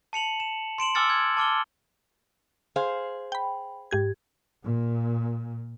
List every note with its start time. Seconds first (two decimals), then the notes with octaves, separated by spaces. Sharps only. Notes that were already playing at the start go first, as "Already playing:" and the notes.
0.13 A5 C#7 F7 F#7
0.40 E7
0.78 C6 D7 E7 F#7
0.95 G#5 D6 E6 F6 A6 C#7
1.10 G#6
1.37 A5 D6 F6 G7
2.76 G#4 C5 F5
3.32 G5 B5
3.91 G#2 G4 G#6
4.64 A#2